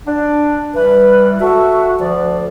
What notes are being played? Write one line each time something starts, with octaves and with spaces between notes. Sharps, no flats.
D4
E3 G3 B4
F#4 A4 E5
D2 F3 D5